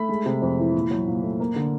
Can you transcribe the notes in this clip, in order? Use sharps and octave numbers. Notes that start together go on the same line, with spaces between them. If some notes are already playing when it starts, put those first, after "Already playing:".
Already playing: A3 B5
G#3
C3
F2
E3
A#2
F#3
A#2
A3
A#3
D3